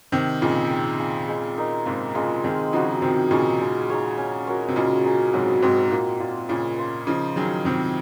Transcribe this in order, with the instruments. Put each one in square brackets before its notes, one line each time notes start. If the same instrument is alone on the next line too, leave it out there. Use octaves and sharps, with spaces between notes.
[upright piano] C3 D#3 [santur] C4
[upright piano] A#2 C#3 [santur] D#4 G#4 D#5
[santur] C4
F4 G#4
G#3
D#4 A#4 D#5
[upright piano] G#2 C3 [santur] A#3
[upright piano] A#2 C#3 [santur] F4 G#4 D#5
[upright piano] C3 D#3 [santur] G#3
[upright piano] C#3 F3 [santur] D#4 F#4
[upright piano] C3 D#3 [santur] C4
[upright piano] A#2 C#3 [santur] D#4 G#4 C#5
[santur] G#3
D#4 G#4 C#5
C#4
F#4 A#4 C#5
[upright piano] C3
[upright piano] A#2 C#3 [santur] G#3
[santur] D#4 G#4
[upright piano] G#2 C3 [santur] F#3
[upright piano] G#2 C3 [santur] C4 D#4
[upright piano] A#2 [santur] A#3
[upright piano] A#2 [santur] F4 C5
[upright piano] A#2 C#3 [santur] C#4
[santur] F4 C5
[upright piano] C#3 F3 [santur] D#4
[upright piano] D#3 F#3 [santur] G#4 D#5
[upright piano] C3 D#3 [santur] F3